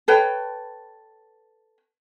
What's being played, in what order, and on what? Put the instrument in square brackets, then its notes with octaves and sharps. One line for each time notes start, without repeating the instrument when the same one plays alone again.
[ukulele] A4 B4 C#5 G5